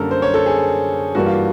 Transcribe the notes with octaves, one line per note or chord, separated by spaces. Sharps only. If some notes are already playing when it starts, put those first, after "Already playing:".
Already playing: F#2 D3 G3 A#3 A4 A#4
C5
C#5
A4
G#4
G2 E3 G3 A#3 F#4
F4